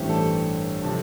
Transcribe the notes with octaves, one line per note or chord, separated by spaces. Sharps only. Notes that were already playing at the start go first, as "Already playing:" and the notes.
Already playing: A1 G2 E3 A3 C4 G4 G5
A4 A5
C3 F3 A4 A5